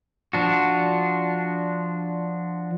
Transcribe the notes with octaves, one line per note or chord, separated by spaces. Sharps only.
F3 D4 F#4